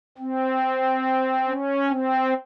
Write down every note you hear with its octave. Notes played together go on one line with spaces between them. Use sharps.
C4
C#4
C4